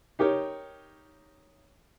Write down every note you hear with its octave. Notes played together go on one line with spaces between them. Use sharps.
D#4 G4 A#4 C#5